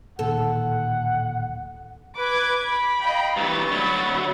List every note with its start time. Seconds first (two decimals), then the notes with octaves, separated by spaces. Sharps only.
0.19 D1 A#2 D#3 A4 F#5
2.17 B4 D6 G#6
2.64 B5
2.99 D#5 F5 G5
3.37 G2 E3 C#6 A6
3.72 D2 F#3 B5